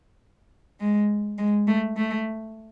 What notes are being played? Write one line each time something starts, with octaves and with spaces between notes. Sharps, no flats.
G#3
G#3
A3
A3